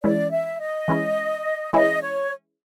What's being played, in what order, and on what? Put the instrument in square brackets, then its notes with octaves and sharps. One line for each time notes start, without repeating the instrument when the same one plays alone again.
[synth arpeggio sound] E3 G#3 C#4 E4 [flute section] D5
[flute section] E5
D#5
[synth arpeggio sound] E3 G#3 C#4 E4
[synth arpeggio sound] E3 G#3 C#4 E4 [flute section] D#5
[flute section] C#5